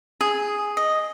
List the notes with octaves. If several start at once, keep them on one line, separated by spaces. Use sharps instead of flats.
G#4
D#5